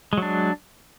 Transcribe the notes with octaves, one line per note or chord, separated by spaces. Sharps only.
F#3 G#3 D4